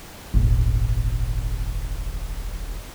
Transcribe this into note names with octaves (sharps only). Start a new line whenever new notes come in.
D#1 G#1